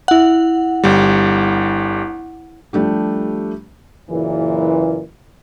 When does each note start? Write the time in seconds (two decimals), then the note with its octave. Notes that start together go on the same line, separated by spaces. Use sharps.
0.08 E4 F#5
0.84 G1 G3
2.73 F3 G3 A3 D4 G4
4.10 F#1 A#2 E3